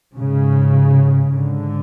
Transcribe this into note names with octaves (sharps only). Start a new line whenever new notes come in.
G#2 C#3
G#2 D3